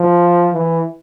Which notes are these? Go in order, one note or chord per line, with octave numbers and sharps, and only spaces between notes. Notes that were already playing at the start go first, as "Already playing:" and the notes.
Already playing: F3
E3